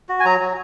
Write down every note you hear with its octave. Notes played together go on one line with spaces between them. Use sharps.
F#4
G#5
F#3 A#5
F#3